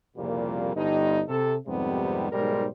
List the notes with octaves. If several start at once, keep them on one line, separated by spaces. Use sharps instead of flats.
C2 F2 A#2 C#3 G3 A#3
G1 G2 D#4
C3 A4
F2 G#2 C3 D#3 G3 B3
B1 G#2 G3 G#3 A#4 C5